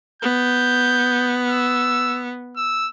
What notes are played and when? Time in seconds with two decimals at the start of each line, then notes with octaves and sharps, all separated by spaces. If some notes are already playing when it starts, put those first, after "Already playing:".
0.22 B3 G6
1.49 E6
2.57 E6